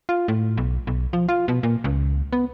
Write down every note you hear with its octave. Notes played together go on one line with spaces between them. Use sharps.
F4
A2
B1
B1
F3
F4
B2
A#2
C#2
B3